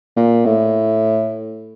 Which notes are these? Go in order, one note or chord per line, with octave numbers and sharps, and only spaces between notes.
A#2
A2